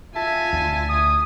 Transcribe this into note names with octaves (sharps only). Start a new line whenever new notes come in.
F4 E5 G#5 A5
D2
D#6